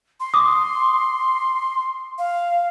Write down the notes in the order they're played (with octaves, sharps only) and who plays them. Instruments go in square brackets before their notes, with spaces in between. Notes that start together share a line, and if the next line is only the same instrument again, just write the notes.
[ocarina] C6
[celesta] D6 D#6
[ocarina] F5